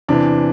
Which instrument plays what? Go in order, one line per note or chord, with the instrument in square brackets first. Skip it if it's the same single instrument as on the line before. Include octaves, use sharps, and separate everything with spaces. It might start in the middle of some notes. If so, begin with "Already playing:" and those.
[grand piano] E2 C3 E3 D4